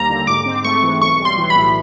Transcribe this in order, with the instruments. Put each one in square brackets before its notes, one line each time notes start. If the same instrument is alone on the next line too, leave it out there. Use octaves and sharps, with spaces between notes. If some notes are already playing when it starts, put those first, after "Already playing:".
Already playing: [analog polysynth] D#2 G3 A#3 [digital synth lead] A#5
[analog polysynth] D3
[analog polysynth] G#2 [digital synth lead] D6
[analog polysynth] C4
[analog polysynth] A3 [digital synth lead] C#6
[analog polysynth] E3
[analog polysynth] B1 [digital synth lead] C#6
[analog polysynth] G3
[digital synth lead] C6
[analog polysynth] E3
[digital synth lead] B5
[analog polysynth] A2